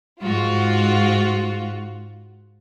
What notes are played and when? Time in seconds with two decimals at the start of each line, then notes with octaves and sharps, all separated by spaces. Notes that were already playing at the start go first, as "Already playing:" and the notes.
0.21 G#2 F4 F#4